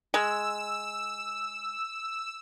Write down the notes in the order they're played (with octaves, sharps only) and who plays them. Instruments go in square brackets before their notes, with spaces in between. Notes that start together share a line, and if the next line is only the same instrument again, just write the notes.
[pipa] G#3 [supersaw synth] E6